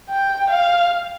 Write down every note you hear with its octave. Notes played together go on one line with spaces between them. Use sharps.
G5
F5